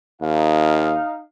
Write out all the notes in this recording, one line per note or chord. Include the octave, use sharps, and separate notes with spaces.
D#2 D#4 F5